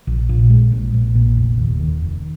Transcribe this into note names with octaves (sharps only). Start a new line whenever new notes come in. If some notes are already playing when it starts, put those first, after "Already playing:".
A#1
A#2
G#3
A#1
A#1
A#2
F1
D#2
D#3
F1